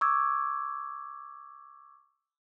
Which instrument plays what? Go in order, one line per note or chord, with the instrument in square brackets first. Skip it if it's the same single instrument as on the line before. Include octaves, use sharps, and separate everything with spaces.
[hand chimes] C#6 D6 E6 G#6